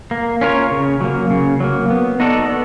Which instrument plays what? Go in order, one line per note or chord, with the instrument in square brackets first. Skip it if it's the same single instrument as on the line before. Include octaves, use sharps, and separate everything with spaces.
[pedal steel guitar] A#3
C#4 F4 A#4 C#5
C#3
F#3 A#3
C#3
F#3 A#3
B3
D#4 F#4 A4 D5
B3